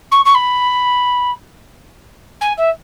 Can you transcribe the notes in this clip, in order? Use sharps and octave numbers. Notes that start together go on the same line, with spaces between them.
C#6
C#6
B5
G#5
E5